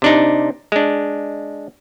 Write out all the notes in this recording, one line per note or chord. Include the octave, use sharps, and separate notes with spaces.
C3 D4 D#4
G#3 D4